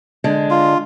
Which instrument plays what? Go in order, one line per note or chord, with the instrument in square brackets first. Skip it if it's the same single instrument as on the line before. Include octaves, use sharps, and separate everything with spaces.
[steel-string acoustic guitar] D3 G#3 D4
[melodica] F4